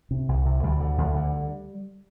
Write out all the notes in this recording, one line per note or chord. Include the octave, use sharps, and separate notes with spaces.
C3
C2
C3
D2 G3
D3
D2
D3